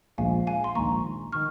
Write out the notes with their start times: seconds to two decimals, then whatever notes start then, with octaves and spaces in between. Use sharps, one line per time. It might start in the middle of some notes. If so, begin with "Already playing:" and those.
0.18 A#1 A#2 F3 G#3 F5 G#5
0.47 F5 G#5
0.64 C6
0.75 A#1 G#2 D#3 A#3 A#5 C#6
1.32 D#3 C#6 F6